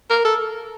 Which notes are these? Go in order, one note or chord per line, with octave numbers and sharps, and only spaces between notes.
A#4
A4